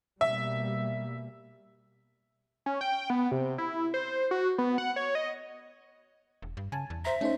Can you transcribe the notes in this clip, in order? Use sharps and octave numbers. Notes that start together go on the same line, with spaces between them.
B2 G3 A#3 E5
C#4
G5
B3
C3
E4
C5
F#4
B3
F#5
C#5
D#5
E1
G2
C#3 G#5 A5
E2
C5 E5 A#5
A3 C#4 D#4 C5